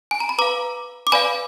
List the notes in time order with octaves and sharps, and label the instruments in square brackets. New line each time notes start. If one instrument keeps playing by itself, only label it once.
[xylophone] G#5
A#5
B5
B4 F5 A#5 D6
D6
B4 D5 F5 G#5 B5